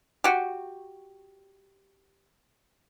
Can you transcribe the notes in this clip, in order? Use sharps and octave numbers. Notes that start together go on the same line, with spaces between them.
F#4 G4